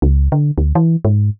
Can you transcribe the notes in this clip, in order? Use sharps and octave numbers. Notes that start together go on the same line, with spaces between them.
C#2
D3
D2
E3
G#2